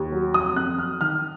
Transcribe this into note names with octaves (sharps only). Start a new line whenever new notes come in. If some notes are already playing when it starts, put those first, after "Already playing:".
Already playing: D#2
F#3
F1 D#6
F2 F#6
F#3 F6
D#3 F6